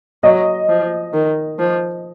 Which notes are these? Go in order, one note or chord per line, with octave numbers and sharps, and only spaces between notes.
F#3 D#5
F3
D#3
F3